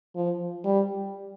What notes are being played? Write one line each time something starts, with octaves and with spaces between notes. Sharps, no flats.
F3
G3